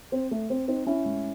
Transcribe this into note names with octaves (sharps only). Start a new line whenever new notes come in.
C4
A3
C4
C4 D#4
C#4 E4
A2 G#3